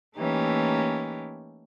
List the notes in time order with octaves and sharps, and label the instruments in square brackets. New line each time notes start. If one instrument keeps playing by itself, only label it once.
[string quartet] E3 A3 A#3 C#4 D#4 G4